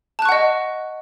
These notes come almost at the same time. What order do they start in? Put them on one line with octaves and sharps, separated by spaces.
A5 F#6 C#6 F#5 D#5